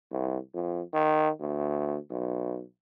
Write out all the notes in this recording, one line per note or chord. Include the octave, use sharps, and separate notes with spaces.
C2
F2
D#3
D2
B1